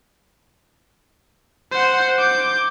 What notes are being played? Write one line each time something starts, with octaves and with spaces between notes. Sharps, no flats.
C5 F#5
D6 G6